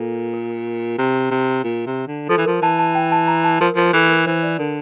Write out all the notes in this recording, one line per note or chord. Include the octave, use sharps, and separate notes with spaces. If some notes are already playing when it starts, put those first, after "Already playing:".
Already playing: A#2 A4
A#4
C3
C3
A#2
C3
D3
F3 A4
E3
F3 A#4
E3 A5
A5
G5
A5
A#5
A5
F3 A#4
F3 A#4
E3 A4
A#4
E3 C5
D5
D3 A#4